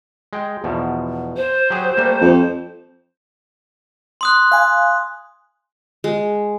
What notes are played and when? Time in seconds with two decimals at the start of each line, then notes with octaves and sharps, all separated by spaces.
0.33 G#3 G5
0.64 E2 B2 F3
1.36 C5
1.70 F#3 G4 G#4
1.97 G3 A3 A#3
2.21 F2
4.21 C6 D#6 F#6
4.52 F5 G#5
6.04 G#3